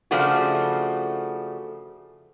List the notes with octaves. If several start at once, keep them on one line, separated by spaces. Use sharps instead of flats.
C#3 F3 A3 D4 F#4